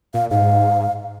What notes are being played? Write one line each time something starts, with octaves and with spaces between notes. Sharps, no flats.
A#2 F5
G#2 F5